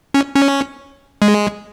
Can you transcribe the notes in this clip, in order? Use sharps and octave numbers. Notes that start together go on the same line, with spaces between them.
C#4
C#4
G#3